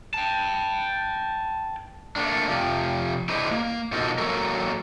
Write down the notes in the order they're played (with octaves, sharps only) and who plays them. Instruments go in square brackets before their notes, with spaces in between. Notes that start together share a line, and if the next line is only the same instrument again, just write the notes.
[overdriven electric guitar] G5 A5
[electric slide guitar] A3 A#3 D4
C3 F3
D4 E4 G#4 B4 C5 D#5
A#3
B2 F3 A#3 D#4 F#4 A4
F#3 A#3 F#4 A4 A#4